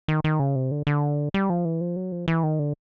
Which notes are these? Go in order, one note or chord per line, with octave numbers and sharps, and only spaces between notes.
D#3
D#3
C#3
C3
D3
D3
G3
F3
E3
F3
F#3
F3
E3
D#3
D3